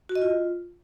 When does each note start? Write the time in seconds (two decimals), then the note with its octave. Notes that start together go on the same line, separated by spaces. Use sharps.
0.09 F#4
0.15 D#5
0.22 F4